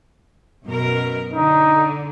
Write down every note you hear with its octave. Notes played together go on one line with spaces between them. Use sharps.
F#2 B2 A#4
D3 D#4